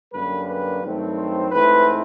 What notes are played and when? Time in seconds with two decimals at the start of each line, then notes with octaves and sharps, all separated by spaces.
0.13 F#2 D3 G3 A#3 B4
0.47 B4
0.83 G2 D#3 F#3 A3 C4
1.17 C5
1.51 G#2 E3 A3 C4 B4